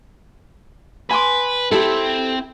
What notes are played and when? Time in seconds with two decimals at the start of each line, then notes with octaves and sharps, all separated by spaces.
1.11 B4 G#5 C6 D6
1.72 C4 E4 G4 A4 B5